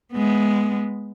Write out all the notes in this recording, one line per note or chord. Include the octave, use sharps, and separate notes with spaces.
G#3 B3